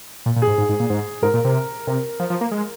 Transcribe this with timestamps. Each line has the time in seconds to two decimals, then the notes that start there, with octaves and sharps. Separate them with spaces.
0.26 A#2
0.36 A#2
0.42 G#4
0.47 G#2
0.58 G#2
0.69 G#2
0.80 A#2
0.90 G#2
1.22 G#2 A#4
1.34 A#2
1.45 C3
1.87 C3 A#4
2.20 F3
2.30 F3
2.41 A#3
2.52 G#3